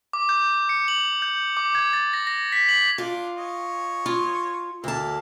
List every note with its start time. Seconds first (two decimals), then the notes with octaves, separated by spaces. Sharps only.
0.13 D6
0.29 G6
0.69 C#7
0.88 F#7
1.22 G6
1.57 D6
1.75 G#6
1.93 A6
2.13 A#6
2.27 A#6
2.52 B6
2.69 F#7
2.98 D4 F4 D6
3.37 C#5 D#5
4.06 F4
4.84 D2 A#3 E4 A5